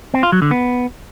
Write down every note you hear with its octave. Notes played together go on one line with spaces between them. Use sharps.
C4
F4
F#3
D3
B3